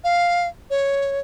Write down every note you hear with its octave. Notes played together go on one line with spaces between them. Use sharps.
F5
C#5